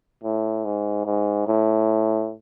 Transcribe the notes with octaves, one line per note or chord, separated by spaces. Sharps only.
A2
G#2
G#2
A2